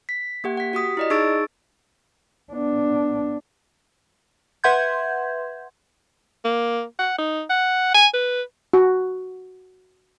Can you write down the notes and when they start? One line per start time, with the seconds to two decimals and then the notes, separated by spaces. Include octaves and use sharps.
0.09 B6
0.44 A#3 G4 F#5
0.57 F#5 B6
0.73 F#4 G4 D#6 B6
0.97 E4 D5 D#5
1.10 D#4 G#4 C#6 E6 A6 D7
2.53 B3 D4
4.64 B4 E5 F#5 C6 G6 G#6
6.45 A#3
6.99 F#5
7.19 D#4
7.50 F#5
7.94 G#5
8.14 B4
8.74 F#4